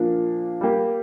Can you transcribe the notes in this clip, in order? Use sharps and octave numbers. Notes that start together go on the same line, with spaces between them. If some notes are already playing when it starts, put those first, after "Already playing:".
Already playing: A#2 F3 A#3 D4
G3 A#3 G4